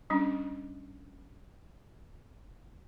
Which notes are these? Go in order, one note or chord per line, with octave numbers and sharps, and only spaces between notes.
G3 C#4 D4